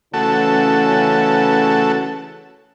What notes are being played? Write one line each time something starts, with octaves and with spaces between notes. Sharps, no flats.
C#3 E3 A3 C#4 F#4 A4